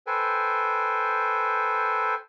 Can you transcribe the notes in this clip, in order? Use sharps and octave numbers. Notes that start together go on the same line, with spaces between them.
A4 B4 C5 G5 G#5